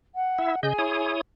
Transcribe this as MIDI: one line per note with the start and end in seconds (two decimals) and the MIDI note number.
0.15 0.59 78
0.38 0.55 64
0.38 0.55 76
0.63 0.73 49
0.63 1.14 68
0.63 0.73 75
0.63 1.14 80
0.63 0.73 91
0.78 1.21 64
0.78 1.21 73
0.78 1.21 87